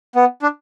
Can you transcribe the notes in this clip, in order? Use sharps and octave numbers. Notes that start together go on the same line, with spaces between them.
B3
D4